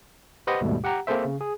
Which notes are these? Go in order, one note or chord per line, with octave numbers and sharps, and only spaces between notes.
G4 B4 C5 D#5 F#5
D#2 G#2 B2 G3 A3
G4 F#5 G5 A#5
A#3 C4 G#4 A4 C5 E5
C#3
G#4